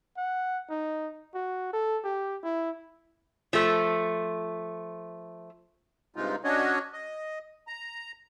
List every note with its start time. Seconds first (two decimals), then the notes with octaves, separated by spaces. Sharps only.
0.17 F#5
0.70 D#4
1.34 F#4
1.73 A4
2.04 G4
2.43 E4
3.53 F3 A3
6.16 G2 C3 G#3 D#4 F4
6.44 C#4 D4 F#4 C#5 D#5
6.93 D#5
7.67 A#5